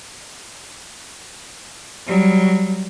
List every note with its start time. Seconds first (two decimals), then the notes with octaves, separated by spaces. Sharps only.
2.06 F#3 G3